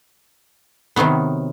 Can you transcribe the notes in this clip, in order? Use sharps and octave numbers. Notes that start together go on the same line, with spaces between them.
C3 D#3 F#3 B3